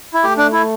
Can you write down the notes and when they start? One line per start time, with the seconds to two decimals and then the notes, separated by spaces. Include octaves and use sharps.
0.14 E4
0.24 A3 G4
0.38 D4
0.52 E4